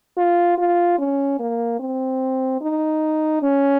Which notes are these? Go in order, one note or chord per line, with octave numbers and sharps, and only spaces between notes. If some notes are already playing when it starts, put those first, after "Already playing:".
F4
F4
C#4
A#3
C4
D#4
C#4